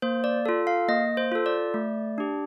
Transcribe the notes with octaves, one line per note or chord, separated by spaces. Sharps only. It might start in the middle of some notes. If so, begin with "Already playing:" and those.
A#3 C5
D5
F4 A4
F5
A#3 D#5
C5
F4 A4
D5
A3
D4 G4